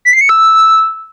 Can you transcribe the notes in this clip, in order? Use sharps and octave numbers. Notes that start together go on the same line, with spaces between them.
B6
C7
C#7
E6